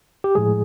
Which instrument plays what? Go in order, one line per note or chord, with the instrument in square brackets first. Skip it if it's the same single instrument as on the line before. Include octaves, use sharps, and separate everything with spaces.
[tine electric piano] G4
A2 F3 G#3 G#4